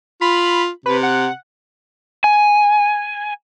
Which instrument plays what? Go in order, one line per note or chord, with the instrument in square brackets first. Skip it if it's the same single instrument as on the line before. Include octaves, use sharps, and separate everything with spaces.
[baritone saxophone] F4 [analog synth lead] B5
[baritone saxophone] C3 [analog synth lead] B4
[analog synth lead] F#5
[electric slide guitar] G#5